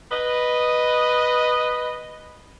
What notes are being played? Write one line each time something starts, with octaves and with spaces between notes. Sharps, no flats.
B4 D#5